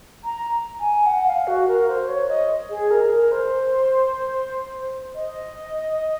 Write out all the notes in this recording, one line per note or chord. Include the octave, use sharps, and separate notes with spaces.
A#5
G#5
F#5
F5
F#4
A#4
C5
C#5
D#5
G#4
A#4
A#4
C5
D#5